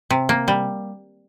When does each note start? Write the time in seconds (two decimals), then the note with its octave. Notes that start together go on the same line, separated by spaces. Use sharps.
0.10 C3
0.29 A#3
0.48 G3